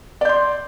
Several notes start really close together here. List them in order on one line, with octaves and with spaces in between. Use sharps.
D5 G6 C6